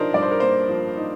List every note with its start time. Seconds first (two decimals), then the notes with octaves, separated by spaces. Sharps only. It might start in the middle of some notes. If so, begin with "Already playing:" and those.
Already playing: F3 D4 D#4 A#4 C5
0.14 G2 D5
0.22 C5
0.31 A#4
0.40 A#3 C5
0.69 F3
0.97 D#4